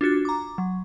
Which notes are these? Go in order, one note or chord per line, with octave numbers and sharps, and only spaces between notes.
D4 F4 F#4 A6
A#5 D6
F#3